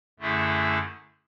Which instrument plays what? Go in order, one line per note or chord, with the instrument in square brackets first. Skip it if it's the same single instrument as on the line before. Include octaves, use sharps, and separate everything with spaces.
[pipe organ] F#2 D3 A3 E4 G#4